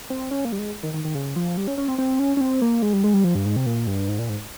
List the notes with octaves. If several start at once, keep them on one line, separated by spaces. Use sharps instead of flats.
C4
C#4
A#3
G3
G#3
D#3
D#3
D#3
C#3
F3
G3
C#4
C#4
C4
C4
C#4
C#4
C4
A#3
G#3
G3
G#3
G3
F3
G2
G#2
C3
A#2
G2
G#2
A#2
G#2